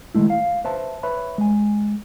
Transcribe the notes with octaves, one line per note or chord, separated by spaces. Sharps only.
D#3 E3 G#3 A3 E4
F5
B4 C5 E5 A5
B4 C#5 E5 B5
G#3 G#5